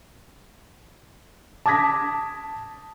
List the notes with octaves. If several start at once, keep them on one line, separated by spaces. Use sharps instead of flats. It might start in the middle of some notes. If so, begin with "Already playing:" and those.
A5 D6 D#6 G#6 A#6 B6